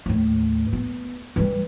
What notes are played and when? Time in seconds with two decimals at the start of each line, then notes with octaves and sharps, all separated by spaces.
0.06 D#2 A2
0.73 B3
1.36 E3 G3